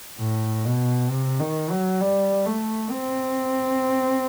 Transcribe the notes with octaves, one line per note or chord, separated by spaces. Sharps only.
A2
B2
C3
D#3
F#3
G3
A3
C4